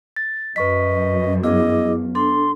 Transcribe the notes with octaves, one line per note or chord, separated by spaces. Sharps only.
A6
F#2 B4 D#5 C#6 B6
B3 E4 G#4 D#5 D6
D4 A4 C6